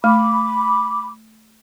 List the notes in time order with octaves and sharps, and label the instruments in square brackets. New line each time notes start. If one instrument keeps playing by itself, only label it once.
[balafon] A3 [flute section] B5 D6